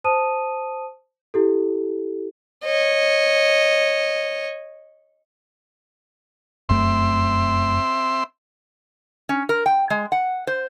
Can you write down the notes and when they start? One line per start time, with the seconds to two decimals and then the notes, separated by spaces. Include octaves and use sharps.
0.04 C5 A5 D#6 D#7
1.34 E4 G4 A4
2.64 C#5 D#5
6.69 F1 F#2 A3 C4 E5 C6
9.29 C#4
9.49 A#4
9.66 G5
9.90 G#3
10.12 F#5
10.47 C5